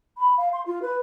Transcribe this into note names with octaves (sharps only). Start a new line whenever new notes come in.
B5
F5
C6
F4
B4